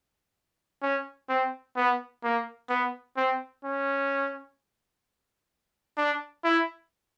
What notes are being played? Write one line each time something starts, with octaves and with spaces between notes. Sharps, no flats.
C#4
C4
B3
A#3
B3
C4
C#4
D4
E4